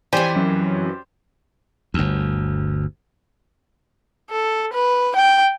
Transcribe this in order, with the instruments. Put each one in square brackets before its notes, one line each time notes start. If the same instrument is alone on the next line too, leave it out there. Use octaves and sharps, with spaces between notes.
[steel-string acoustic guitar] F2 E3 [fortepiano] G4 C5 D5 [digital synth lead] G#5
[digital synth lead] F#2
[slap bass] G1 D2
[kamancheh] A4
B4
G5